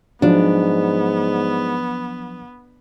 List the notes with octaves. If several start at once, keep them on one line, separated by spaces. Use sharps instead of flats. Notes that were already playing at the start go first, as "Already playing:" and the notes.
G#2 F3 F#3 B3 D4